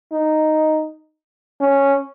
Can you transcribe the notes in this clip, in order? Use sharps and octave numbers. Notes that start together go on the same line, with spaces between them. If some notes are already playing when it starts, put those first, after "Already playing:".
D#4
C#4